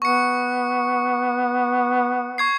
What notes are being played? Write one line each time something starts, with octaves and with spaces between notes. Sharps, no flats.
B3 C#6 C#7
C#6 G#6 C7